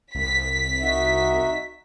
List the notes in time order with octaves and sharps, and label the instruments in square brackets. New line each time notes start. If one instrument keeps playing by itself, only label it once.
[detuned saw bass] C2 [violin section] B6
[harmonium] D#4 F#4 E5